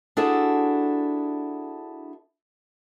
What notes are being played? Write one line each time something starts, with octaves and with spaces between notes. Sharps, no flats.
D4 E4 F#4 G#4 A4